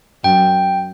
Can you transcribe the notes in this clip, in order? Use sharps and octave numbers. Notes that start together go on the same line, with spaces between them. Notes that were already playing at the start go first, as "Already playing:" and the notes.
F#2 G5